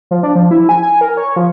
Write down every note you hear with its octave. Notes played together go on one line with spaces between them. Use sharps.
F3
D4
F3
E4
G#5
G#5
A#4
C#5
F3